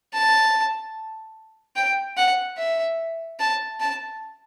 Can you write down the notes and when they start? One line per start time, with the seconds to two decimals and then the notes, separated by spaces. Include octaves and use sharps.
0.14 A5
1.76 G5
2.17 F#5
2.58 E5
3.39 A5
3.80 A5